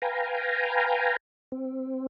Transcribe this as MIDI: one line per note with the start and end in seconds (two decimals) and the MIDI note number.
0.02 1.16 71
0.02 1.16 77
0.02 1.16 79
0.02 1.16 80
0.02 1.16 82
1.52 2.07 60